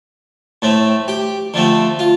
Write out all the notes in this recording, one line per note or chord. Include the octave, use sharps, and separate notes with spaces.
A2 A3 C4
G4
D3 F3 A3 C4
F4